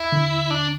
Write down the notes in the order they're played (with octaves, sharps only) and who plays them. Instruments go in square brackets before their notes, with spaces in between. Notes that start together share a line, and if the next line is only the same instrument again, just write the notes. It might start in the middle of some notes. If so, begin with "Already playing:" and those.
Already playing: [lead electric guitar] E4
[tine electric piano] D3
[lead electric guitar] D4